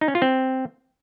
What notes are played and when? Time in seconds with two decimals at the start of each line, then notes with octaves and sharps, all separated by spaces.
0.01 D#4
0.08 C#4
0.15 F4
0.22 C4